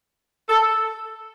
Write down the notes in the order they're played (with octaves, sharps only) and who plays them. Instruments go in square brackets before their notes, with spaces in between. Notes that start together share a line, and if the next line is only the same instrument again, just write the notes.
[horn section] A4